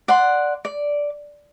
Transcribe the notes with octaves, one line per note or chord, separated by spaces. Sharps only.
D5 F#5 C6
D5